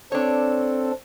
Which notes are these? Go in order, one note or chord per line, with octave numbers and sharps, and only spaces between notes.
C4 D4 A4 C#5